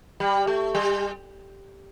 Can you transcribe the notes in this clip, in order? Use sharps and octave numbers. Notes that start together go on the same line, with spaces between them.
G3
A3
G3